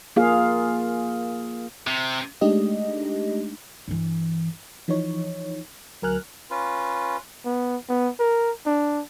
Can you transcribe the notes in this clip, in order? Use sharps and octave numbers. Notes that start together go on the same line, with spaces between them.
A#3 F4 G#4 F5
C3
G#3 A3 D4 D#4 G4 D#5
G2 E3
E3 F3 D#4 C#5
D2 F#3 A#4 G#5 F6 F#6
C#4 F4 B4
B3
B3
A#4
D4